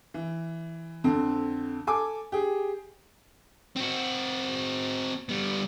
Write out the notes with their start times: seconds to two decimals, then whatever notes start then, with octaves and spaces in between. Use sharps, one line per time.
0.14 E3
1.04 F2 D3 C4
1.87 A4 G#5 D6
2.32 G4 G#4
3.76 C4 F#4
5.29 G3 B3